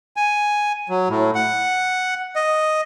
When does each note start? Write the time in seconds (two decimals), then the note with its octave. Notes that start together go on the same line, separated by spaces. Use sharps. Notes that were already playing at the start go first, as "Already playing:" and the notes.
0.17 G#5
0.89 F#3
1.09 A2
1.35 F#5
2.36 D#5